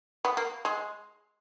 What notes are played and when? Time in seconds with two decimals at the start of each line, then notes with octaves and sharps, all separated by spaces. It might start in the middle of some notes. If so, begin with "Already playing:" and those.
0.25 B3
0.37 A#3
0.65 G#3